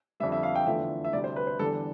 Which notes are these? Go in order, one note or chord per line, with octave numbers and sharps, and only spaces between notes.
F2 D3 G3 E5
E5
F5
G5
E2 D3 F3 A3 E5
E5
D2 C3 G3 D5
C5
B4
C5
E2 D3 G3 A4